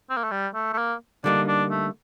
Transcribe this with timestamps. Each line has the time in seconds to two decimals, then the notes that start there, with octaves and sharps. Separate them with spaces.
0.10 C4
0.17 A#3
0.24 A3
0.31 G3
0.54 A3
0.73 A3
0.78 A#3
1.24 D3 G3 A#3 D4 D#4
1.48 D4
1.70 A3